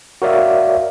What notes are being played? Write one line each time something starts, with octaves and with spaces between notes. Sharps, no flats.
F#4 A#4 C#5 D5 E5 F5